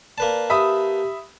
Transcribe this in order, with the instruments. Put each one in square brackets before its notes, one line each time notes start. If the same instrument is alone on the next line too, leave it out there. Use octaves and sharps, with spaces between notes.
[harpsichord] A#3 B4 A5 [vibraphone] D5 F5
[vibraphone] G4 [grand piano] E5 B5 D#6